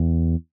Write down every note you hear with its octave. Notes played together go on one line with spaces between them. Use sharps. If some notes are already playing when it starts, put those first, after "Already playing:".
Already playing: E2